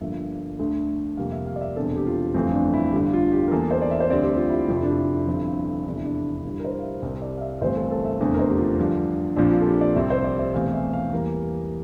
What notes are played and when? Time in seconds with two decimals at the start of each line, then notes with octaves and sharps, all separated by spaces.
0.01 G1 G2 F3 A#3 E5
0.59 D2 D3 A3
1.17 F2 C3 G3 A#3 F5
1.32 E5
1.47 F5
1.56 D5
1.61 E5
1.76 E1 E2 D3 G3 C4 A4
1.96 G4
2.07 F4
2.15 G4
2.34 G1 F2 E3 A3 C4
2.54 D4
2.73 E4
2.93 G1 G2 D3 G4
3.13 F4
3.32 G4
3.48 A#4
3.51 E2 E3 A#3 A4
3.71 C5
3.82 D5
3.91 E5
4.00 C5
4.10 D2 D3 G3 C4 D5
4.23 G4
4.37 F4
4.50 E4
4.68 F1 F2 C3 F3 F4
4.76 E4
4.83 D4
4.90 E4
5.27 G1 G2 F3 C4
5.85 F1 E2 C3 D4
5.96 E4
6.04 D4
6.35 D4
6.44 G2 D3 G3 E4
6.59 A#4
6.64 C5
6.79 F5
6.83 E5
7.02 C2 C3 G3 C4
7.22 D5
7.38 F5
7.41 E5
7.61 G1 G2 E3 A3 C4 C5
7.76 A4
7.85 A#4
7.91 A4
8.05 E5
8.20 F1 E2 D3 A3 C4
8.34 A#4
8.39 C5
8.49 G4
8.58 F4
8.79 G2 D3 F3
9.36 A#1 A#2 F3 C4 D4
9.51 F4
9.61 A4
9.66 G4
9.81 D5
9.95 C2 C3 G3 C4 E5
10.10 C5
10.24 D5
10.39 E5
10.54 E1 E2 E3 A3 C4 F5
10.73 E5
10.93 F5
11.13 E2 E3 G3 A#3 A#4